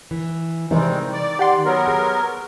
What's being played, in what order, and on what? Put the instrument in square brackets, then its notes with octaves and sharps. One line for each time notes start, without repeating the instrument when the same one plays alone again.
[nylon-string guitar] E3
[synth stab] C3 E3 [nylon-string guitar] D#3 [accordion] G3 G#3 C4
[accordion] D5
[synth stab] G4 F#5 C6
[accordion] F#3 B3 A#4
[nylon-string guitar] G#4